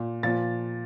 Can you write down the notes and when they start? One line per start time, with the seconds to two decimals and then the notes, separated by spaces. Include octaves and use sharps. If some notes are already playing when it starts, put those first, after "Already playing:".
Already playing: A#2
0.23 A#2 F3 A6